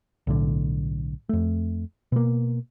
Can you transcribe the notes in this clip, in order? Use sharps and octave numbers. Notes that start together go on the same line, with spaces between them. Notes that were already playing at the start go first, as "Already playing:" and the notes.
B1 A2 D3
F2 A3
B2 A#3